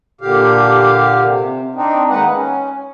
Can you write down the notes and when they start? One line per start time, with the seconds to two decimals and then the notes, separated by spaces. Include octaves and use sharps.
0.21 A#2 D3 G4 F5
1.23 C3
1.75 C4 D4 D#4
2.10 D#3 G#3 A#3 D#4 B4 F#5
2.33 C#4